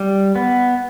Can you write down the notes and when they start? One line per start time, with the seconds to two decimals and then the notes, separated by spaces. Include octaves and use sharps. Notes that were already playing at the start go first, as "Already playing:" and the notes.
Already playing: G3
0.36 B3